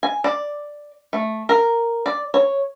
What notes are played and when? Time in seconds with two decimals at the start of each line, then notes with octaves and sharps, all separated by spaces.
0.03 G#5
0.24 D5
1.13 A3
1.49 A#4
2.06 D5
2.34 C#5